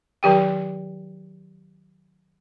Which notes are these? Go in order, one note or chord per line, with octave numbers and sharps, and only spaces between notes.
D#3 F#3 G4 G5